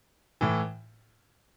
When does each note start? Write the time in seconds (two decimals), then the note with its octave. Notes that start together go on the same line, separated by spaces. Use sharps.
0.41 A2 E3